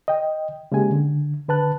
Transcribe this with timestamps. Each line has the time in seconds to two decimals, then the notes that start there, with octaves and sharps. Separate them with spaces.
0.08 D#5 G5
0.72 C#3 G#3 A#3 G4 G#5
0.91 D3
1.48 D3 B4 A5 F#6